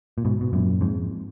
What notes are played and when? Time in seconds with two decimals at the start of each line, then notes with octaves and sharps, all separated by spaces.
0.18 A#2
0.25 G#2 B2
0.41 B2
0.53 F#2 A#2
0.81 F2 G#2